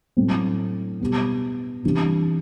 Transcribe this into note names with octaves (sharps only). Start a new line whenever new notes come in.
A2 F#3 A3 C4
B2 G3 B3
C3 E3 G3 D4